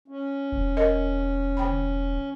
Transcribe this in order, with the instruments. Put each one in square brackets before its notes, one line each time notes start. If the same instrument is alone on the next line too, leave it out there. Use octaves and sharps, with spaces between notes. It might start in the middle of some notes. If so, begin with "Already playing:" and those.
[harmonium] C#4
[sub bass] E1
[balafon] A#4 D#5
D3 G5 B5